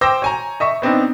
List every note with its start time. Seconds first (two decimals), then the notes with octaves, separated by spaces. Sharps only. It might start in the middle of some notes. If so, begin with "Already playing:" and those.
0.01 C5 G5 D6 E6 G6 A#6
0.22 C#5 G#5 A#5
0.60 D#5 E5 C#6
0.82 B3 C4 D4 D#4